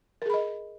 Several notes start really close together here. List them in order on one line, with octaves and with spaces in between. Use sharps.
A#4 G#4 B5 D#5